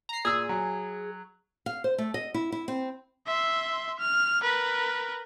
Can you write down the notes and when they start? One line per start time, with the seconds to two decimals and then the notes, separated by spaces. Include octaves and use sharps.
0.09 A#5 C7
0.25 A#2 G#4 E6
0.49 F#3
1.66 F5
1.84 C5
1.98 A3
2.14 D#5
2.34 E4
2.52 E4
2.68 C4
3.26 E5 C6
3.99 F6
4.42 A#4 B4